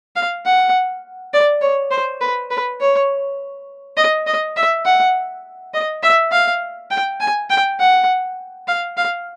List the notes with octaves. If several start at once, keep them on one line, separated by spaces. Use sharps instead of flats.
F5
F#5
D5
C#5
C5
B4
B4
C#5
D#5
D#5
E5
F#5
D#5
E5
F5
G5
G#5
G5
F#5
F5
F5